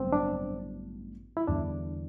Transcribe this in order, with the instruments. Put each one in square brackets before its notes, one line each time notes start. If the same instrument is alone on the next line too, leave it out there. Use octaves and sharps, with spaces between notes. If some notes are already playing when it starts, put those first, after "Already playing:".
Already playing: [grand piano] A1 G2 D3 F#3 B3 [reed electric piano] C4
[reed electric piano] D4
E4
[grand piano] E2 D3 G3 [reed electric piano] D4